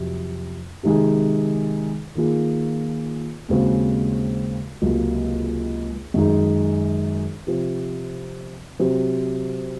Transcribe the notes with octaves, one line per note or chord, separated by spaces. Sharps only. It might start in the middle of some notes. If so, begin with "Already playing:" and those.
Already playing: F2 C3 F#3
C3 D#3 G#3 D#4 G#4
D#3 A#3 F4 G#4
D#2 C#3 G#3 C4 F#4
C#2 C3 F#3 A#3
F#2 D#3 G#3 D#4 G#4
C3 F3 C4
C3 F#3 C4 F#4